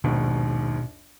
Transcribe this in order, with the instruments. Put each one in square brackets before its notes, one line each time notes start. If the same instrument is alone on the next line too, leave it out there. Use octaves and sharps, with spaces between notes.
[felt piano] A#1 D#2 G#2 [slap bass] B2